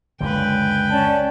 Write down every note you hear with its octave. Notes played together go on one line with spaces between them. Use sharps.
C#2 F#2 D3 B4 G5
C#4 D5 A5